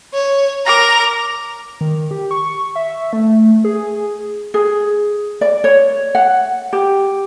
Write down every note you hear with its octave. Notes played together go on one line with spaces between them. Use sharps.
C#5
A#4 A#5 D6 A#6
D#3
G4
C#6
E5
A3
G#4
G#4
D5
C#5
F#5
G4